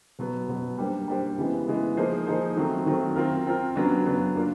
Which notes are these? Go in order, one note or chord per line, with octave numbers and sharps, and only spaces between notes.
B2 F#3 B3
B2 F#3 B3
G3 A#3 D4 G4 C5
G3 A#3 D4 G4 C5
C#3 E3 G#3 B3
C#3 E3 G#3 B3
F3 A#3 D#4 G#4 C5
F3 A#3 D#4 G#4 C5
D#3 F#3 A3 C4
D#3 F#3 A3 C4
C4 F4 A#4
C4 F4 A#4
C#3 F#3 B3 D4
C#3 F#3 B3 D4
A#3 D4 F4